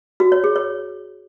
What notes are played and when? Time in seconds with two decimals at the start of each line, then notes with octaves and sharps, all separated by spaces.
0.20 F#4
0.32 C#5
0.44 G#4
0.56 C#5